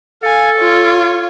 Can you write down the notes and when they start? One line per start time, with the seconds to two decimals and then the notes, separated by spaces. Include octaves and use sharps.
0.23 A4 F5 G#5
0.58 F4 C#5